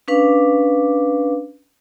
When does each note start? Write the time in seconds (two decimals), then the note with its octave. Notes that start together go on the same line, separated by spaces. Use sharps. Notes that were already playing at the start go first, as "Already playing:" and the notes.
0.08 C#4 D4 B4 F5 D6